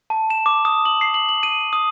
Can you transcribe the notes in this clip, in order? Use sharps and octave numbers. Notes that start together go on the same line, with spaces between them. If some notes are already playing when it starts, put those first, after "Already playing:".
A5
E7
D6
D#6
F#7
C7
F#7
F#7
D#7
D#6